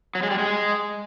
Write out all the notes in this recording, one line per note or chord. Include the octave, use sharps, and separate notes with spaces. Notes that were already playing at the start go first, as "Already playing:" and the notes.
F#3
G#3
G3
G#3